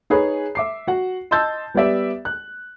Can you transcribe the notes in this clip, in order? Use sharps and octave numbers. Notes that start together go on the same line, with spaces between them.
D#4 G#4 B4 C#5
E5 D6 C7
F#4 F#5
D#5 A5 C6 E6 G6 A6
G3 B3 G4 D5 E5
F#6